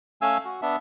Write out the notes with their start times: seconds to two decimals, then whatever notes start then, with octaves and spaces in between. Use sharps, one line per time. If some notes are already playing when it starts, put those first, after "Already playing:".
0.22 A3 C#4 F5 G#5 E6
0.45 F#4
0.62 B3 D4 E5